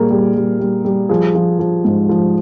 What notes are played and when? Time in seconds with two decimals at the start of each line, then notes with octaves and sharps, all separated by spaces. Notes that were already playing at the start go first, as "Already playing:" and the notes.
Already playing: A#2 G3 G#4 A#4
0.11 G3
0.35 G3
0.60 G3
0.85 G3
1.09 F3 G#4
1.35 F3
1.59 F3
1.85 G#2
2.09 F3